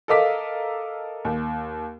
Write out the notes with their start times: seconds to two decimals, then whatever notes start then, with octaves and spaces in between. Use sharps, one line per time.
0.08 A4 A#4 D#5 F5 D6 B6
1.25 D#2